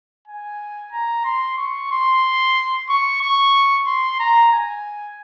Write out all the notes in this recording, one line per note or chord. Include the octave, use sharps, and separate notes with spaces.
G#5
A#5
C6
C#6
C6
C#6
C#6
C6
A#5
G#5